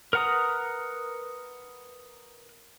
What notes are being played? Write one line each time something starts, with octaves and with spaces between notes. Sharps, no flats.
A#4 B4 F#5 A#5 D#6